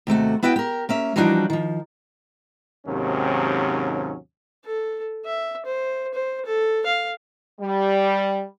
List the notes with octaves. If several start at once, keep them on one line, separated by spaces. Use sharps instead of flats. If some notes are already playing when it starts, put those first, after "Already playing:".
D#2 C3 A3 F#4
B3 E4 F#4 B4 G5
G4 A#4
A#3 C#4 E5
E3 F3 G3 D4 D#4 F#4
D#3 F3
D#2 G#2 C3 D#3 F#3 C#4
A4
E5
C5
C5
A4
F5
G3